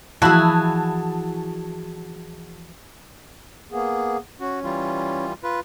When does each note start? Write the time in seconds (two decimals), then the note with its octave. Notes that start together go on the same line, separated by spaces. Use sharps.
0.22 E3 F3 E4 F#4 G#4 A5
3.71 A#3 B3 G#4
4.40 C#4 F#4
4.64 E3 G3 F4
5.43 F4 B4